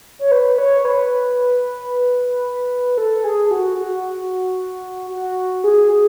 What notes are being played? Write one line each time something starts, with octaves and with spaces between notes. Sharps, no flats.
C#5
B4
C#5
B4
A4
G#4
F#4
F#4
F#4
G#4
G#4